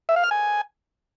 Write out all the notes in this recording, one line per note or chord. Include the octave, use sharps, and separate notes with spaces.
E5
F5
F6
G#5